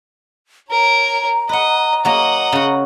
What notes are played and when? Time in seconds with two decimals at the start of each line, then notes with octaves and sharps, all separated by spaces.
0.70 A#4 C#5 A#5
1.49 B4 D#5 F#5
2.05 F#3 A#3 A#4 D#5 F#5
2.52 C#3 F#4